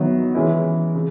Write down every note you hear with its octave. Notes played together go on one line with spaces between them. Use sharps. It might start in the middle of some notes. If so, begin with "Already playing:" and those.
Already playing: D#3 F#3 B3 E4
E3 G#3 C#4 E4
C#3